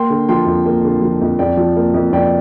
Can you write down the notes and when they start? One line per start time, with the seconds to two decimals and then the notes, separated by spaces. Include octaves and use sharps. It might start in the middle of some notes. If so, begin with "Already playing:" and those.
Already playing: A#3 G5 C6
0.10 D3
0.29 F3 G5 C6
0.46 F2
0.66 A#3
0.84 D3
1.02 F3
1.21 F2
1.39 F2 D5 G5
1.57 F3
1.77 A#3
1.94 F2
2.13 F2 D5 G5